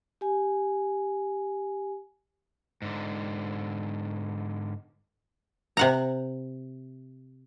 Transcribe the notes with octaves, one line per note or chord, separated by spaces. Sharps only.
G4 G#5
G#2 D3
C3 F#5 A#5